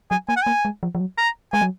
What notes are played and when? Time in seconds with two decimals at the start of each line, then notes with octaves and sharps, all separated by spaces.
0.11 F#3 G#5
0.29 A#3 G#5
0.36 F#5
0.43 A#3 G#5
0.65 G#3
0.83 F3
0.95 F3
1.00 F#3
1.18 A#5
1.53 G#3 G#5
1.61 F#3